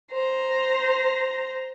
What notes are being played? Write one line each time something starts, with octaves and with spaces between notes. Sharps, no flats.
C5 A#5